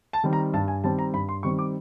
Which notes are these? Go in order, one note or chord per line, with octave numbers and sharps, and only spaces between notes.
A5
D#3 G3 C4
A#5
G2 A5
G#5
D#3 G3 C4 A5
A#5
G2 B5
C6
D#3 G3 C4 C#6
D6